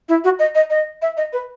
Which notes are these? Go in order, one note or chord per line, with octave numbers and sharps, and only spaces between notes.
E4
F#4
D#5
D#5
D#5
E5
D#5
B4